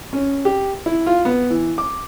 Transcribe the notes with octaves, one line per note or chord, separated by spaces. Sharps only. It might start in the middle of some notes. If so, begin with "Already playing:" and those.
C#4
G4
E4
F4
B3
E3
D6